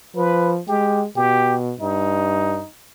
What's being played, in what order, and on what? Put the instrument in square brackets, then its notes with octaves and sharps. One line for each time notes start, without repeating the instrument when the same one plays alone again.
[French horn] F3 [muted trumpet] B4
[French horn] G#3 [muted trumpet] G4
[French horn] B2 [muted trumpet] G4
[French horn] G2 [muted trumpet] D#4